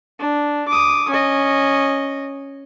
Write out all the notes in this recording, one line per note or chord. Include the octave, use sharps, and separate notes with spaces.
D4
D6 D#6
C#4 D#5